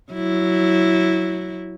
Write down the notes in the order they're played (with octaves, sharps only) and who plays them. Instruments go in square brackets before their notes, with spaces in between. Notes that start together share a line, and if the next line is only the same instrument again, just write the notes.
[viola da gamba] F#3 E4